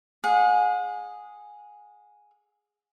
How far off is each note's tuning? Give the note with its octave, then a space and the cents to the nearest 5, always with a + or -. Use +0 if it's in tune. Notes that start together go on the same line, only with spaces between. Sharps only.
G#4 +0 F#5 -40